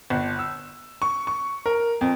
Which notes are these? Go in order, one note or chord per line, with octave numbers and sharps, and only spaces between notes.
G1
E6
C#6
C#6
A#4
F2